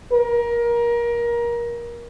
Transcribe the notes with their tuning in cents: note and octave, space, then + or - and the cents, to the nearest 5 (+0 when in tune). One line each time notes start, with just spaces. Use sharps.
A#4 +25